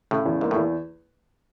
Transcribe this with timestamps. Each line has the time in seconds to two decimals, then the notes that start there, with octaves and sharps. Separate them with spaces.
0.11 A2 C#3
0.25 E2
0.41 G#2 A#3
0.51 E2 A2